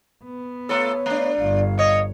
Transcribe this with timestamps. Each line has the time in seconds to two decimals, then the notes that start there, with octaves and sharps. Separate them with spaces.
0.24 B3
0.69 A3 F4 A4 C#5
1.06 A3 D4
1.39 G1 F5
1.79 C#5 D#5